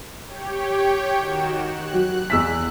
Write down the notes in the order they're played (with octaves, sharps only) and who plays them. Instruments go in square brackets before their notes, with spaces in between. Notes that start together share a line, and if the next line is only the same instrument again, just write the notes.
[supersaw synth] G4 C#5 G5
D#3 F#4 E7
F#6
[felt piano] F#3
E2 E6 B6